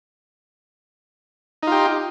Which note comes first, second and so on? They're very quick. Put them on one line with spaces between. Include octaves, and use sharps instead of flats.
D#4 F4 G4